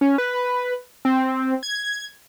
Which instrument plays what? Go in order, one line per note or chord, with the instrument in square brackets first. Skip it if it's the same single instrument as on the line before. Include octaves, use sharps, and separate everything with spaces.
[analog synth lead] C#4
B4
C4
G#6